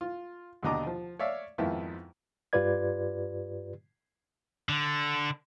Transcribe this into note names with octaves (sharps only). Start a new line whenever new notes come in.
F4
D#2 B2 D3 D#5 A#5 D6
F3
C#5 D5 E5 F5
F2 G#2 D#3 B3 E4 F4
G2 F4 G4 B4 D5 G#6
D3